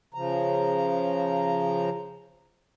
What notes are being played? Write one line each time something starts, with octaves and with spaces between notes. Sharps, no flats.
C#3 F3 A#5